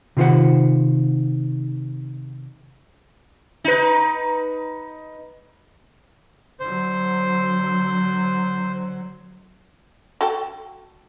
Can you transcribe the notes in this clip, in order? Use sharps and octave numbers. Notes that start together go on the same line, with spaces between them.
C3 D#3 F4 A4 C5 F#5
D#4 B4
D3 F#3 C5
F#4 A4 G5